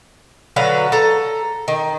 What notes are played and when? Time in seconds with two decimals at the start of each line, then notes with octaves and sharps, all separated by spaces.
0.56 D3 F#3 B4 F5
0.92 A4 A#5
1.68 D#3